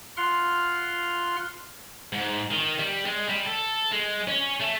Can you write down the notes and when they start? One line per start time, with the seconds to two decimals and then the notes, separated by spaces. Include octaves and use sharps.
0.17 F4 F#5 C6 F6
2.13 G#2
2.51 D#3
2.79 G3
3.06 G#3
3.29 G3
3.46 A4
3.92 G#3
4.28 C#4
4.60 A3